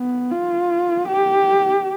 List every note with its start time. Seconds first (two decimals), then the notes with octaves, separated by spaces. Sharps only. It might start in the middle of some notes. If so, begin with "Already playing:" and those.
Already playing: B3
0.31 F4
1.08 G4